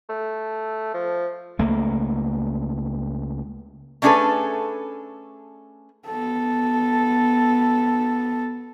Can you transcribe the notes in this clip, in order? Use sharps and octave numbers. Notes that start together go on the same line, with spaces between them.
A3
F3
C#2 A3 A#3
A3 C#4 D4 G#4 A4 B4
B3 A4